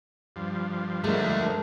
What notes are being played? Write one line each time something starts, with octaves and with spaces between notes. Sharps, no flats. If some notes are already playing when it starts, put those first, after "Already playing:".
G2 F3
G#3 A3 D4 A#4